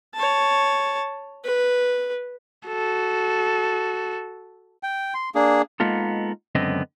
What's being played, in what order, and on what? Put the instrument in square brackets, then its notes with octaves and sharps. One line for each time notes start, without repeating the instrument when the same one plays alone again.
[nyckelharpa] C#5 A5
B4
[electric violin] F#4 A4
[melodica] G5
C6
A#3 D4 G#4
[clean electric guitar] G#3 A#3 B3 D#4 F4 A4
C#2 F#2 D3 B3 C4 D#5